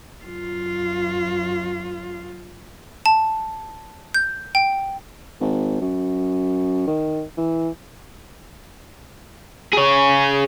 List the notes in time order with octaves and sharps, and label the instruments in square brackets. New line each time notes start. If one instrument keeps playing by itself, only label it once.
[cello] F#2 F4
[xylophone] A5
G6
G5
[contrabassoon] G#1
F#2
D#3
E3
[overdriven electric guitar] G#4 C#5